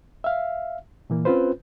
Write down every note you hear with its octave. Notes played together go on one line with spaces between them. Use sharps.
E5 F5
A#2 E3 A#3
C4 C#4 F4 B4 C5